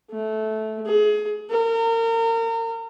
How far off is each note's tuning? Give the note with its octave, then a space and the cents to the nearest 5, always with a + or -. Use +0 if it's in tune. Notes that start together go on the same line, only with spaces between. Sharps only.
A3 -15
G#4 +25
A#4 -35